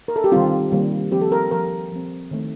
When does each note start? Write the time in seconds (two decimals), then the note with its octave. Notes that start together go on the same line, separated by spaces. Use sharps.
0.08 A#4
0.16 A4
0.24 G4
0.32 D#3 G3 C4 F4
0.72 D#3 G3 A#3
1.11 F3 C4 G4
1.21 A4
1.32 A#4
1.51 F3 A#3 A#4
1.92 F3 C4
2.31 D#3 A3 C4